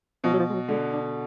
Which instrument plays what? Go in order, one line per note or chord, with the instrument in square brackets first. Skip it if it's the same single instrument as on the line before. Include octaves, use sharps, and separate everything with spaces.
[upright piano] B2 [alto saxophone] F3
[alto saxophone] F#3
F3
G#3
F#3
[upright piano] D3 [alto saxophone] G#3
[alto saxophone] D4